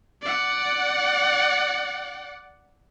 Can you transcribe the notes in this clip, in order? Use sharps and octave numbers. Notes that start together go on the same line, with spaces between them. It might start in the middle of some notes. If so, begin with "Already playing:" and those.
D5 F#5